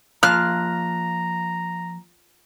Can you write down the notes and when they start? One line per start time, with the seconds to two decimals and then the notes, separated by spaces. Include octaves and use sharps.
0.23 F3 A#3 F4 A5 A#5 F6 F#6